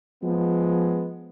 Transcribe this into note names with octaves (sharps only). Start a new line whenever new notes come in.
F3 G#3 B3